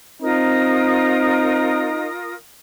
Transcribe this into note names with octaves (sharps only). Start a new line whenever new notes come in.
C4 D#4 F4 A#4 D#6